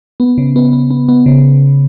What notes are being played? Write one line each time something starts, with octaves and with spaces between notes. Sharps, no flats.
B3
C#3
B3
B3
B3
B3
C#3